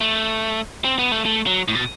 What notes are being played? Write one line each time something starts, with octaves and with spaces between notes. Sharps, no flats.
A3
C4
B3
A3
A3
F#3
A2
B2